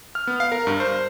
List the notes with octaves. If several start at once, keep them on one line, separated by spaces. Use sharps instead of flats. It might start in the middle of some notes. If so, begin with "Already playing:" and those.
F6
B3
F5
A#4
G2
C5